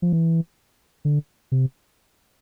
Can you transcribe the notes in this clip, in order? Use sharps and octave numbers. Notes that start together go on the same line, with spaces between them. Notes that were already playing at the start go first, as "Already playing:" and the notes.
F3
E3
D3
C3